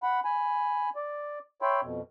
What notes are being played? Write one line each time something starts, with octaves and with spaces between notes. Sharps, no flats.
F#5 B5
G#5 B5
D5
C#5 E5 G5 B5 C6
F2 B2